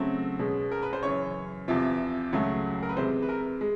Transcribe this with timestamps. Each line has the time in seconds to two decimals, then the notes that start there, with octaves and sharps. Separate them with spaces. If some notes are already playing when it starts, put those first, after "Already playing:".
Already playing: C#3 F#3 A3 C4
0.39 B2 G#3 C#4
0.71 A#4
0.83 B4
0.93 C5
1.03 F#2 C#3 E3 C#5
1.68 E2 C3 F3
2.33 C#2 C#3 F#3 A3
2.83 A#4
2.89 B4
2.97 C3 E3 G#3 C5
3.22 B4
3.29 A#4
3.61 G#3